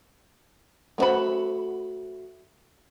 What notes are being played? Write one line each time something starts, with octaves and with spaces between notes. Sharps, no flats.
A3 F4 F#4 C5 B5